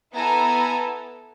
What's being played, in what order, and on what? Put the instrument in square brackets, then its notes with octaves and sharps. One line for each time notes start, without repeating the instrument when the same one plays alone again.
[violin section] B3 E4 A4 G#5 A#5